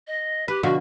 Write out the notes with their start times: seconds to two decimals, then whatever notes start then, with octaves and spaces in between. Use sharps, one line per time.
0.07 D#5
0.48 G4 B4
0.63 B2 D3 F3 F#4